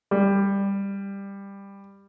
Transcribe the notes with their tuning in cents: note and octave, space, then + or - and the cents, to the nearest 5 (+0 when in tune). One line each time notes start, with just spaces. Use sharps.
G3 +15